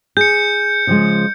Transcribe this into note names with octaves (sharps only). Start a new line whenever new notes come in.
G#4 G6 C#7
C#3 F3 G#3